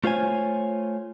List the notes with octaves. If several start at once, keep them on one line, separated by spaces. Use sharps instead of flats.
A3 F4 C5 C#5 G#5